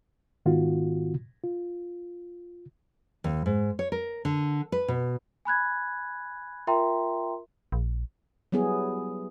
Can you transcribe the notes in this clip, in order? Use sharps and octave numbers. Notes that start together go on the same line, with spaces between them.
G#2 D#3 B3 F4 F#4
F4
D#2
G#2
C#5
A#4
D3
B4
B2
G#5 B5 F#6 G#6
F4 A#4 E5 G5 A#5 C6
A#1
F#3 G3 B3 E4 G#4